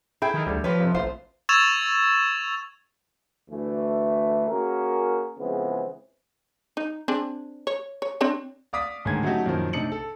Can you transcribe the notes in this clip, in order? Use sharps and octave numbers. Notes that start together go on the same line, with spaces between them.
E4 G#4 A4 E5 G5 B5
D#3
D2 G3
F3 G4 B4 C#5
F2 C3
A1 F4 C5 E5
C#6 E6 G#6 A6 E7 F7
D2 E3 A3
A#3 C#4 F#4 G#4 A#4
F2 C#3 E3 G#3 B3 C4
D#4
C4 D4 G#4
C#5
C#5
C4 D4 C#5
D5 F5 D6 D#6 B6
A1 G#2 D3 D#3 G#4 G#6
F#3 A3 C#4 D#4 F#4 G4
F#2 A#2 D#3 F3
A2 C3 D4 D#4 C#7 F#7
A4